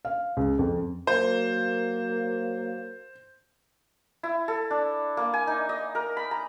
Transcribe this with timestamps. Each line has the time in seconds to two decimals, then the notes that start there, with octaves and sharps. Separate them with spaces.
0.05 F5
0.37 C#2
0.59 F2
1.07 F#3 A#3 C5
4.23 E4
4.48 A4
4.71 D4
5.17 A#3
5.34 G#5
5.47 D#4
5.69 D#5
5.95 A#4
6.17 B5
6.31 A#5